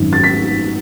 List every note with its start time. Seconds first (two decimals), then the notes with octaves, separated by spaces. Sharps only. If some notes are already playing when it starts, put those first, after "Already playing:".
Already playing: G#1 F#2 D#3
0.13 A6
0.24 B6